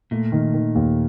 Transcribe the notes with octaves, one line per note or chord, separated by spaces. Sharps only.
A#2 A3
D#3
D#3
D#2